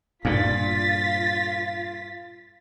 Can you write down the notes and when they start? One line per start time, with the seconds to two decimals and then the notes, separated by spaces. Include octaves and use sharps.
0.25 G2 A#2 F4 A6 B6